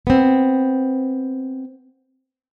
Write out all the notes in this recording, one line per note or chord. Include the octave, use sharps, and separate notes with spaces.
B3 C4